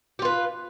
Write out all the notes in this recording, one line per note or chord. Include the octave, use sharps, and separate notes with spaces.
F4 G4 B4